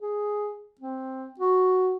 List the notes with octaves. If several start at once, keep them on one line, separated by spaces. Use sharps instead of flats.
G#4
C4
F#4